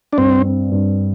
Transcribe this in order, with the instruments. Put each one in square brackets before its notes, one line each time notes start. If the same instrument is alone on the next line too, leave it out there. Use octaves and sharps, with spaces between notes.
[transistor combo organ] D4
[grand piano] G2 [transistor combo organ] C4
[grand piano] C4
G2